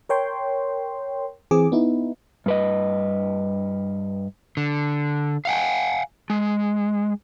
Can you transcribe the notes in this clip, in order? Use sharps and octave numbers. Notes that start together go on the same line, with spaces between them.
A#4 C#5 G5 C6
E3 C4 G#4 D6
B3 D#4 E4
G2 B4 D#5
D3
F5 F#5 G#5
G#3